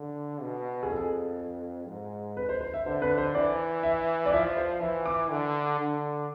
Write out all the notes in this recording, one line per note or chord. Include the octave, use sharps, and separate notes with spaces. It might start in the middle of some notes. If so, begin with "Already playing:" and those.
Already playing: D3
B2
G#4
F2 A4
G#2
B4
C5
C5
E5
D3 C5
B4
C5
E3 D5
E5
D5
F3 E5
C5
E3 E5
D6
D3
D3